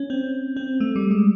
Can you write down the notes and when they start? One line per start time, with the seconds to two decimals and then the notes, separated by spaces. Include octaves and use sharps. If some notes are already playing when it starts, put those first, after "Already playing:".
Already playing: C#4
0.10 C4
0.56 C4
0.80 A3
0.96 G3
1.11 G#3